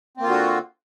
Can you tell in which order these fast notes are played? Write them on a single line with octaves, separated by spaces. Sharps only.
C4 A#3 F4 D3 F#4